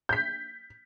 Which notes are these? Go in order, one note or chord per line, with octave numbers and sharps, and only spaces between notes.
G6 B6